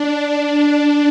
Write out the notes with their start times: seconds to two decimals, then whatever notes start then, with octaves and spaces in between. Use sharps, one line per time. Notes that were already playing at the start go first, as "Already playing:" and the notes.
Already playing: D4